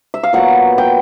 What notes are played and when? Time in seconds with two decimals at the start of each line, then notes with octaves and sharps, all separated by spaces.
0.14 E5
0.23 F5
0.33 A#2 F#3 B3 F#5
0.78 G5